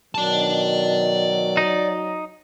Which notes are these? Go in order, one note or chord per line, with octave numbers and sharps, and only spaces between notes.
B2 D#3 F#3 D5 A5
D#4